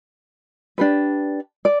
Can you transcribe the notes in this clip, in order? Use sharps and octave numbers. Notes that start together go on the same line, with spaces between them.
D4 G4 B4
D5